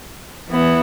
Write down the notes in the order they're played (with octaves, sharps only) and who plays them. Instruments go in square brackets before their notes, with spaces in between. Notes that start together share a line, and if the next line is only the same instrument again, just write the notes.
[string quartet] E3 B3 E4